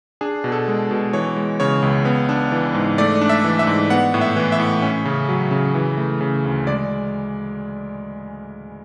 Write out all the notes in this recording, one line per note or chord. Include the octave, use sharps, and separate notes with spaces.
D4 G#4
B2
A4
G#3
B2
E3 C#5
G#3
C#3 C#5
C#2
B3
D4
E3
G#2
A3 D5
D4
E5
E3
E5
G#2
B3 F#5
A2
E5
E3
E5
A2
C#4
C#3
F#3
C#3
E3
A3
C#3
D2
G#3 D5